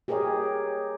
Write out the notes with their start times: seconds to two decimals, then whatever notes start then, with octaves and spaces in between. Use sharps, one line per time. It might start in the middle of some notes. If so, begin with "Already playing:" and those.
0.08 G4 G#4 A#4 C#5 D#5